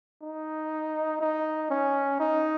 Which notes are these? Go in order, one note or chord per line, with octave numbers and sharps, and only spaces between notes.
D#4
D#4
C#4
D#4